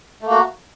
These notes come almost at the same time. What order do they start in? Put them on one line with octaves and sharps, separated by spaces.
A3 A#3 F#4